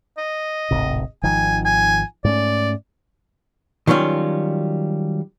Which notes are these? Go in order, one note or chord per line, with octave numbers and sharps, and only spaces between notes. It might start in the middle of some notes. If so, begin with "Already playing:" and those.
D#5
D1 G#1 C3
G#1 D#3 F3 G#5
G#5
G#2 A3 C#4 D5
D#3 F#3 G3 C#4 F4